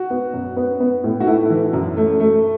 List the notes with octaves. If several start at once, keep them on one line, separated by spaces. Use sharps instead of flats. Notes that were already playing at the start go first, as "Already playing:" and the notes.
Already playing: F#4
B3
F#2
B3
B3
A2
F#4
A3 E4
E3
F#2
A3
A3